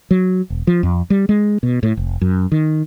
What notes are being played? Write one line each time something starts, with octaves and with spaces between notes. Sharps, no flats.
F#3
E1
F3
F2
G3
G#3
B2
A2
F1
F#2
D#3